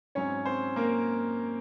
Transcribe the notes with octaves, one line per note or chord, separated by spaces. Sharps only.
G#2 F#3 C4 C#4 C#5
C4 C5
A#3 A#4